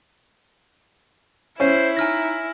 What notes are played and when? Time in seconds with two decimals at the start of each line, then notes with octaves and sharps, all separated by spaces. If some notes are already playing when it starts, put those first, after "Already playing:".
1.60 C#4 E4 C5
1.97 D#4 G#5 F6 A#6